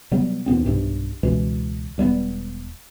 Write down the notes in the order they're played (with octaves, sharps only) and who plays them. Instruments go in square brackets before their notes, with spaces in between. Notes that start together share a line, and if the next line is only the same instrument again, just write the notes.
[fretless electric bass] C3 F#3 G3 B3
D#2 A#2 B3 C4
B1 G2 C3
C#2 B2 E3 G#3
E1 G3 A3 B3